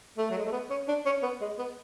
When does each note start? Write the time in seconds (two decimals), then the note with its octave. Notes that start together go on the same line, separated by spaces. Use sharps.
0.18 A3
0.30 F#3
0.38 G#3
0.46 A3
0.52 B3
0.70 C#4
0.88 D4
1.06 C#4
1.23 B3
1.41 G#3
1.59 B3